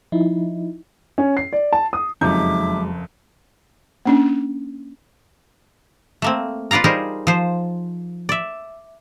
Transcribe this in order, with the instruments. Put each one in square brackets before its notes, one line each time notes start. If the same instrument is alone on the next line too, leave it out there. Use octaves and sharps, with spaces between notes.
[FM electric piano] F3 D#4 E4
[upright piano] C#4
C7
D5
A5
D#6
[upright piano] F#1 F2 [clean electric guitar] F#3 G#3 [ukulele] D#4 [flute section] E5 D6
[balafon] A#3 C#4 D4
[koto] A3 A#3 C4
F4 B4 D5 F5 A#5
G3 D#4 G#4 A#4 C5
F3 C5
D5 E5